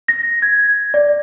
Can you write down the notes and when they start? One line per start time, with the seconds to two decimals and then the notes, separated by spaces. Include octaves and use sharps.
0.08 A#6
0.42 G#6
0.94 D5